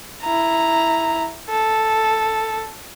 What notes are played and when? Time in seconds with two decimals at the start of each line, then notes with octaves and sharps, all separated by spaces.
0.23 E4 A#5
1.50 A4